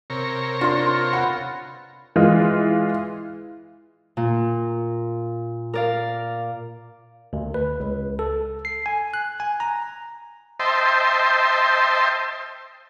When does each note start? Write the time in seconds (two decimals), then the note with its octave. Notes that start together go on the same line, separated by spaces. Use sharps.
0.10 C3 A#4 C#5
0.61 D4 F4 C6
1.13 B4 F#5
2.16 E3 G#3 F4
4.17 A#2
5.73 A#4 D5 F5
7.33 D2
7.54 B4
7.80 C#2
8.19 A4
8.65 C7
8.86 G#5
9.14 F#6
9.40 G#5
9.60 A#5
10.60 C5 D#5 E5 G5 A5 C6